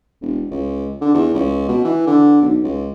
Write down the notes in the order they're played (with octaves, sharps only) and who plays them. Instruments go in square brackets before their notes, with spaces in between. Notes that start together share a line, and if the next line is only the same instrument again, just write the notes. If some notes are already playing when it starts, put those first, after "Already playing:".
[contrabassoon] E1
C#2
D3
E2
C#2
B2
E3
D3
B1
C#2